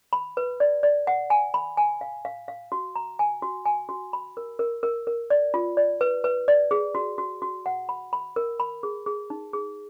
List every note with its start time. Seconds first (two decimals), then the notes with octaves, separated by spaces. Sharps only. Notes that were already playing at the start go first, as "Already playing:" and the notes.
0.13 B5
0.37 B4
0.60 D5
0.83 D5
1.07 F#5
1.30 G#5
1.54 B5
1.77 G#5
2.01 F5
2.25 F5
2.48 F5
2.72 F#4
2.96 A#5
3.19 G#5
3.42 F#4
3.66 G#5
3.89 F#4
4.13 B5
4.37 A#4
4.59 A#4
4.83 A#4
5.07 A#4
5.30 D5
5.54 F4
5.77 D5
6.01 B4
6.24 B4
6.48 D5
6.71 G#4
6.95 F#4
7.18 F#4
7.42 F#4
7.66 F#5
7.89 B5
8.13 B5
8.36 A#4
8.60 B5
8.83 G#4
9.06 G#4
9.30 D#4
9.53 G#4